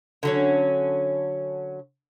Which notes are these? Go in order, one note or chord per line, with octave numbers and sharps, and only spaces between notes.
D3 F#3 C#4